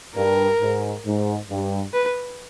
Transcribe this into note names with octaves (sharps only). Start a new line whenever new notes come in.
G2 A#4
G#2
G#2
G2
B4